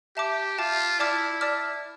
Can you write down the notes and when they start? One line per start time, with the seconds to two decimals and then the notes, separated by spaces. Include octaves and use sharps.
0.17 G4 E5 A5 D6
0.58 F4 E5 A5 D6
0.99 E4 D5 A5 D6 F6
1.41 D5 A5 D6 F6